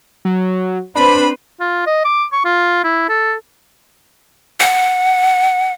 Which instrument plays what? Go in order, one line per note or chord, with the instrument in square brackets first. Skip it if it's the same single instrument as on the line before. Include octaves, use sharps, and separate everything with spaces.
[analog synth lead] F#3
[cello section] C4 B4 C5 [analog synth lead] D4 [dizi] B5
[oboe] F4
D#5
D6
C#6
F4
E4
A4
[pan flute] F#5